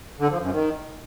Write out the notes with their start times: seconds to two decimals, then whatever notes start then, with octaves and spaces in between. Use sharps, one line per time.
0.20 D3
0.31 F3
0.42 F#2
0.53 D#3